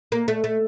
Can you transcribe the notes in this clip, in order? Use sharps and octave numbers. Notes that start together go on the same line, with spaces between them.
A#3
A3
A3